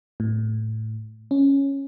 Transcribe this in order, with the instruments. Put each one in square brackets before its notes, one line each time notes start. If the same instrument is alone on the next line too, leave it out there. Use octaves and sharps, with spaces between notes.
[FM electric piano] A2
C#4